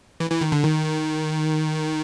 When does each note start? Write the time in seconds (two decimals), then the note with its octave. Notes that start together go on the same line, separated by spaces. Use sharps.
0.20 E3
0.31 E3
0.41 D#3
0.52 D3
0.64 D#3